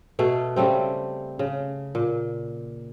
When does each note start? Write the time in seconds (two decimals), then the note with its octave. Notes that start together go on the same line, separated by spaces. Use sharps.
0.19 B2 A3 G#4
0.56 C#3 G3 A3 C4
1.39 C#3
1.95 A#2